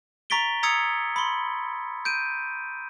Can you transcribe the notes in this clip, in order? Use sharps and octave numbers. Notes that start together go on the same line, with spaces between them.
A#5 C#6 A6 B6 D7 G7
A#5 D#6 E6 G#6 C#7
B5 C6
G6 D7 D#7